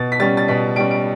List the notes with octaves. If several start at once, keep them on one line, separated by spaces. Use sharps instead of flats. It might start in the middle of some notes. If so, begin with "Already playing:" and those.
Already playing: B2 A6
B6
G3 C#4 A6
A6
B2 B6
G3 C#4 D7
D7